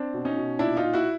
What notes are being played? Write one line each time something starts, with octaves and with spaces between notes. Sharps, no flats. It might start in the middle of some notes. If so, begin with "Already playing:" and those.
Already playing: C4 D4
B2
C#4 D#4
B2
A#2 D4 E4
D#4 F4
A#2
E4 F#4